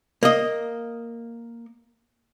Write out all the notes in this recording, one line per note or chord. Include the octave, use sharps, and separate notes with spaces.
A#3 D#5